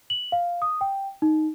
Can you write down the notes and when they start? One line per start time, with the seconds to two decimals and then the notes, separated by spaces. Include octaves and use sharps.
0.10 F#7
0.32 F5
0.62 D#6
0.81 G5
1.22 D#4